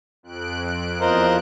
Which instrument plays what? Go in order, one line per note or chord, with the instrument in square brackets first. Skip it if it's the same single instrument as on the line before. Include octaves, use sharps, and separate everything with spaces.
[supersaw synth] F2 F#6 D7
[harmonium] E2 F4 D#5 [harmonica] A#4 C5